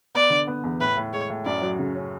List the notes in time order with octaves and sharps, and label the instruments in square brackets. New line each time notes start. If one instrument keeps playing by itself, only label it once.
[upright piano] B3 [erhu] D5
[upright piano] D3
B3
E2
[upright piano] A2 [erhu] B4
[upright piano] A2
[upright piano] G#3 [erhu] C#5
[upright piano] A2
[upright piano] F#2 [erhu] D5
[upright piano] F#3
C#3
C#4